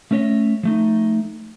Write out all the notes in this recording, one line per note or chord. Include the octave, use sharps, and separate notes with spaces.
A3 C#4 A#4 C#5 D#5 E5
F3 A3 D#4